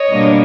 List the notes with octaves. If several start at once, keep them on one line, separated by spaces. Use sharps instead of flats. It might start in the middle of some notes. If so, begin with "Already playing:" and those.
Already playing: C#5 D#5
B2 G3 A#3 D4